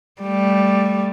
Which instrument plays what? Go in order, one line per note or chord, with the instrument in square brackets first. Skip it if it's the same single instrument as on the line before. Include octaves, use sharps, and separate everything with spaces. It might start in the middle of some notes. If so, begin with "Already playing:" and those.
[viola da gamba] G3 A3